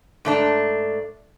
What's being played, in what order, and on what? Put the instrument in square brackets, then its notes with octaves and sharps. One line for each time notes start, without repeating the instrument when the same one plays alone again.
[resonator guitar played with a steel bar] G#2 A3 D4